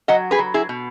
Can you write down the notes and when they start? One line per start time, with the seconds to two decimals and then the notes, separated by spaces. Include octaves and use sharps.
0.08 F#3 D#5 F#5
0.31 G#4 B4
0.39 F#3
0.54 E4 G#4
0.69 B2